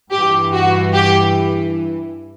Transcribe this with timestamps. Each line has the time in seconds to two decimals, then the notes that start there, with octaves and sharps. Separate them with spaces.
0.11 G2 E3 G4
0.52 F#4
0.93 G4